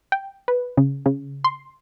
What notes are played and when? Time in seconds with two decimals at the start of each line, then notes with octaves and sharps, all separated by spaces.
0.12 G5
0.48 B4
0.77 C#3
1.06 C#3
1.44 C6